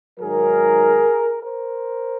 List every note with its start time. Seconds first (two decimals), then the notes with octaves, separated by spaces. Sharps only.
0.19 G#2 D#3 F#3 G#4 A#4
1.43 A#4 C5